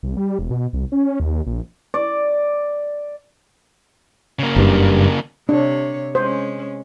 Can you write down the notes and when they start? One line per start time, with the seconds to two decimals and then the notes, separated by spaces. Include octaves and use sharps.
0.03 C2
0.17 G3
0.39 E1
0.51 B2
0.73 C2
0.92 C#4
1.20 D#2
1.46 A#1
1.94 D5
4.39 C#3 A#3
4.56 F#1 G2
5.49 C3 D4 C#5
6.15 G#3 C#4 C5